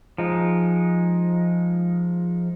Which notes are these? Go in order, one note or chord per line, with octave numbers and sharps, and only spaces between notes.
F3 G#3 D#4